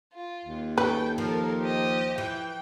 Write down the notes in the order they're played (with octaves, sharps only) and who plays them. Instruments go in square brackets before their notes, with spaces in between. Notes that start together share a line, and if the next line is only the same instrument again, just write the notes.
[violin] F4
[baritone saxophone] D#2
[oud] C#4 [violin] A4 G5 [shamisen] B4
[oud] F3 [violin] A4 A#4
[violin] G4 D#5
[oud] E3 [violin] G5